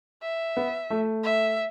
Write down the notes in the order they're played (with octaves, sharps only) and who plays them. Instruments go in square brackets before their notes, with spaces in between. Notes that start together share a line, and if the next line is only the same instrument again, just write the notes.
[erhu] E5
[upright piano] B3
A3
[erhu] E5